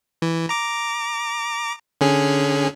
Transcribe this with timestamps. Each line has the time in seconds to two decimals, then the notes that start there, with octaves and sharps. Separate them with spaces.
0.22 E3
0.49 A#5 D6
2.01 D3 C#4 G#4